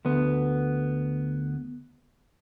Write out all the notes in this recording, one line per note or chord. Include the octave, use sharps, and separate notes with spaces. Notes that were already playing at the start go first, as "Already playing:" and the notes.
D2 B3